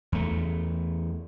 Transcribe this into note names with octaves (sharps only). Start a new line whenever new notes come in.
E2 A3